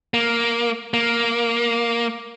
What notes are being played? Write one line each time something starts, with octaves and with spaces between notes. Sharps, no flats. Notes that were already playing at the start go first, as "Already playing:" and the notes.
A#3
A#3